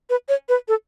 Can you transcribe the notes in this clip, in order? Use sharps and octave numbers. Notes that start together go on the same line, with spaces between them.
B4
C#5
B4
A4